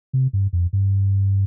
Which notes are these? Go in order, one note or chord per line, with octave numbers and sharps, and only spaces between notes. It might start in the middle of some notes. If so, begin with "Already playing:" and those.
C3
G2
F2
G2